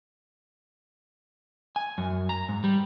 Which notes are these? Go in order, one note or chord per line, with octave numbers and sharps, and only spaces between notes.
G#5
F#2
A#5
G#2
G3